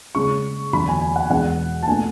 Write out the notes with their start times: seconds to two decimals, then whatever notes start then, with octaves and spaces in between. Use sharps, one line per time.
0.15 C#3 G#3 C#4 C#6
0.73 E2 D3 F#3 B5
0.88 G#5
1.01 G#5
1.16 F#5
1.30 E2 B2 G#3 D4 F#5
1.83 A5
1.88 B2 A3 D4 G#5